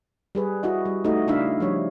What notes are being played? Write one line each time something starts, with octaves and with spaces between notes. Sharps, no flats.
G3 G#4 B4
E4 F#4 D#5
G3
A3 D#4 F#4 D#5
C#3 D4 E4 E5 F5
F3 G3 C#5